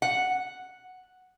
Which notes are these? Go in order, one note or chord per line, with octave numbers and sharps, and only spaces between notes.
F#5